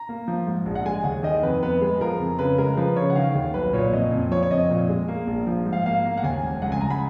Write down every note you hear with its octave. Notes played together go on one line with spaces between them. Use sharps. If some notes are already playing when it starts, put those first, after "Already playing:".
Already playing: A#5
A#3
F3
G#2
A#1
F#5
G#3 G#5
D#2 F#5
D#3 D#5
F2 B4
B3 B4
G#3
F3 A#4
F2
C#3 B4
G#3 A#4
F3 B4
C#3 C#5
F#5
D#3 F5
D#2
B1 B4
A#2 C#5
F2 D#5
F2
F3 C#5
C#5
F2 D#5
A#2
G#3
A#3
A#1
F3
G#2
F5
A#3 F5
A#3
F#5
D#2 G#5
F1
C#2 F#5
G#5
C#2 A#5
B5